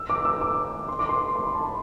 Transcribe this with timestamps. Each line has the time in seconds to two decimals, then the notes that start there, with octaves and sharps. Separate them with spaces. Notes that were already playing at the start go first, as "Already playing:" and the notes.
Already playing: E6
0.10 D6
0.25 E6
0.41 D6
0.88 C6
0.99 D6
1.09 C6
1.35 C6
1.45 B5
1.55 A5
1.65 B5